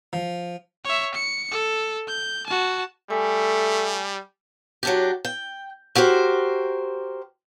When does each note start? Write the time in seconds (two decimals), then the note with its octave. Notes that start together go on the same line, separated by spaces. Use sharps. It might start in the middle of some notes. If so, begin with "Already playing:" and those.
0.13 F3
0.85 C#5 E5
1.15 C#7
1.51 A4
2.07 G6
2.47 F#4 A5
3.10 G3 A3 G#5
4.83 F#3 D4 G4
5.25 G5
5.95 F#4 G4 A#4 C5